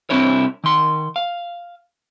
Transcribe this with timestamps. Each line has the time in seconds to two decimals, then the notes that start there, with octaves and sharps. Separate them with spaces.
0.10 C2 D3 C4 D4 E4 C#5
0.64 D#3 C6
1.16 F5